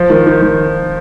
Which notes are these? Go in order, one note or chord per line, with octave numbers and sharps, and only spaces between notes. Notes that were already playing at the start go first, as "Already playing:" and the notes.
Already playing: F3
D#3
D#3
D#3